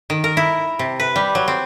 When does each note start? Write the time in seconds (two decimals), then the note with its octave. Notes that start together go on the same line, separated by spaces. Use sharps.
0.10 D#3
0.24 A#4
0.37 E4
0.79 C3
1.00 B4
1.16 G3
1.35 F#3
1.48 C4